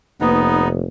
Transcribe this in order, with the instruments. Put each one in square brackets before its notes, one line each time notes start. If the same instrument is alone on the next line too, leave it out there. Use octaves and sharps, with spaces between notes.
[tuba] F1 [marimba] A#3 B4 [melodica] B3 D#4